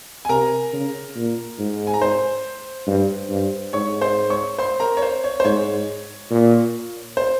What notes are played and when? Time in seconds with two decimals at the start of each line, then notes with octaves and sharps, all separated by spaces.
0.25 G#5
0.29 C3 A#4 A#5
0.73 C#3
1.16 A#2
1.59 G#2
1.87 G#5
1.94 A#5
2.02 C5 C6
2.87 G2
3.30 G2
3.73 G#2 C#5 C#6
4.01 C5 C6
4.30 C#5 C#6
4.58 C5 C6
4.80 A#4 A#5
4.97 C#5
5.02 C5
5.24 C#5
5.40 C5
5.45 G#2 C#5
6.31 A#2
7.17 C5